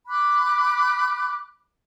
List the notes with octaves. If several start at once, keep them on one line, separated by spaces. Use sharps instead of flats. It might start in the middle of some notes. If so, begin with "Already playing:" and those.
B5 D6 F#6